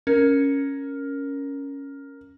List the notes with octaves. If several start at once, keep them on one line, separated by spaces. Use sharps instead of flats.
C#4 A#4